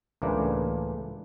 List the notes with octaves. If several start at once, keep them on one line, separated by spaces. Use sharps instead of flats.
C#2 A2 E3 A#3 D4